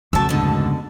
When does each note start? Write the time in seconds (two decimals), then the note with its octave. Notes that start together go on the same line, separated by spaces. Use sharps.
0.13 B1 F2 C#3 F#3 A3 A5 E6
0.29 D2 G#2 B2 D3